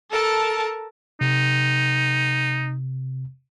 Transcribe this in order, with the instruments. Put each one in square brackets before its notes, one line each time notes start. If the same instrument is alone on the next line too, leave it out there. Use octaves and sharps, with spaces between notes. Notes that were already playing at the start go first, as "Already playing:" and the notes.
[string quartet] A4 A#4 A5
[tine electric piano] C3 [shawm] D#4